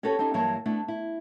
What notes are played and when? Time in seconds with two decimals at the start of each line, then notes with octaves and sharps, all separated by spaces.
0.03 C#4 F#4 G4 A4 B4 C#5
0.19 C4 C#4 D#4 G4
0.34 G2 E3 F#3 A#3 C#5 A5
0.66 A3 B3 D4 E4
0.88 E4